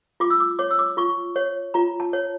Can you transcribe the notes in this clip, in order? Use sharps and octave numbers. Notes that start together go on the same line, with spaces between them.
F4 D6
E6
D6
C#5 D6
E6
D6
F4 C#6
C#5
F4 A#5
A5
C#5